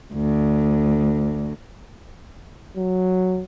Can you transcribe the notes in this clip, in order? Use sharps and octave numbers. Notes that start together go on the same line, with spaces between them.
D2
F#3